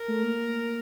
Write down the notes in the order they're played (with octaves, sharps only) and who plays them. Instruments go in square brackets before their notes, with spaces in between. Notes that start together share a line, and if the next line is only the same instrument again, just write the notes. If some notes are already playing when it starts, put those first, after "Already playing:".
Already playing: [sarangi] A#4
[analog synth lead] A3
A#3